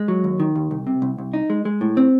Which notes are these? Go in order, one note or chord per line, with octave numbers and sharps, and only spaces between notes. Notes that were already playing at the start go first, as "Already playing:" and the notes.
Already playing: G#3
F#3
D#2
D#3
D#2
C2
C3
C2
C2
D#4
G#3
G#3
A2
C4